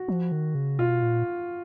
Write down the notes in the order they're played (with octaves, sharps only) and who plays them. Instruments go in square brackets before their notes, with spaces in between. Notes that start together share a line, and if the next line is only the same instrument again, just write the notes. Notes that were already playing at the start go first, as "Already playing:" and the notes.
Already playing: [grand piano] F#4
[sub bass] F3
D#3
C#3
[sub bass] B2 [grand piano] F4
[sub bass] A#2